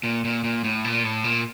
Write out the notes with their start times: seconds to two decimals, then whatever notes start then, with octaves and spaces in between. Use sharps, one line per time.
0.03 A#2
0.25 A#2
0.44 A#2
0.64 A2
0.84 A#2
1.04 A2
1.24 A#2